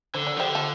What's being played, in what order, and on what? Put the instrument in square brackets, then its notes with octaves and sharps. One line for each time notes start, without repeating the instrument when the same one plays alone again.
[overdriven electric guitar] D3 [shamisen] C5
[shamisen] D5
[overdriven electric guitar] F3
[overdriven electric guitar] D3 [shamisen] G4 C5
[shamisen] F4 A4